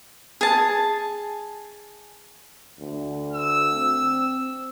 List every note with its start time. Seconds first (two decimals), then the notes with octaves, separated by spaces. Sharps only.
0.41 G#4 A5
2.80 D2
3.33 E6
3.75 C4